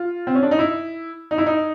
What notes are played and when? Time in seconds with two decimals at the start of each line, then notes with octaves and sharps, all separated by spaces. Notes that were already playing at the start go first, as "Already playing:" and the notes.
Already playing: F4
0.27 C4
0.35 C#4
0.43 D4
0.51 D#4
0.59 E4
1.31 D#4
1.38 E4
1.46 D#4